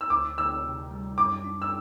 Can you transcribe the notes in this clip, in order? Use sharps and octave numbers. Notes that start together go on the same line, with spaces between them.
E6
D2 D6
D2 E6
C3
G3
F#2 D6
D4
E6